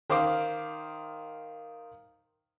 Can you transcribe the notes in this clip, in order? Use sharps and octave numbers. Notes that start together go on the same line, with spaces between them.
D#3 C5 F5 D6